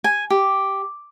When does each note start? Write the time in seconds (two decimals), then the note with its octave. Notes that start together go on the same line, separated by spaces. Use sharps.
0.04 G#5
0.30 G4